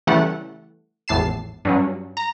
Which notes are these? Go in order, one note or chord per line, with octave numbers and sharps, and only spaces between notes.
C#3 E3 G3 A3 F#5
G#1 E2 A2 A5 C7 E7
G2 F#3 C#4
A#5